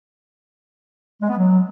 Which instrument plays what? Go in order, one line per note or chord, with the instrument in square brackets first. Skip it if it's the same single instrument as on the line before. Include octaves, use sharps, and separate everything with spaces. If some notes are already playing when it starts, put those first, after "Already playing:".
[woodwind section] G#3
B3
F#3